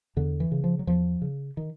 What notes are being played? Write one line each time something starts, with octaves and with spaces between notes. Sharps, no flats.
E2 D3
E3
C#3
F3
F#3
E2 F3
C#3
D#3